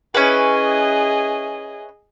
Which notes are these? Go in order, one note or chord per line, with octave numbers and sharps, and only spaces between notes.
C#4 E4 G#4 B4 D#5